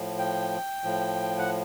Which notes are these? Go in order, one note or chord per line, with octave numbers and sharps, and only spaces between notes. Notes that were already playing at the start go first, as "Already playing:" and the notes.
Already playing: A2 F3
G5
A2 F3
F#5